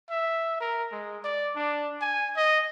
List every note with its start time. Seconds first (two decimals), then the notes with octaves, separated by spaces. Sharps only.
0.10 E5
0.60 A#4
0.92 G#3
1.24 D5
1.56 D4
2.01 G#5
2.37 D#5